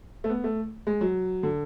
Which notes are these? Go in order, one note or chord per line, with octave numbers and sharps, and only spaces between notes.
A3
B3
A3
G#3
F#3
D3